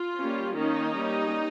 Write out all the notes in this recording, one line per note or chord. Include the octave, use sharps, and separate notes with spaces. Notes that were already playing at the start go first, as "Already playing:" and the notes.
Already playing: F4
G3 A#3 C#4
D#3 A#3 C#4 D#4
G3 A#3 C#4